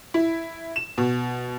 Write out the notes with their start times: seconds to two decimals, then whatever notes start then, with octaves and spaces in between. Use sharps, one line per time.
0.14 E4
0.76 E7
0.98 B2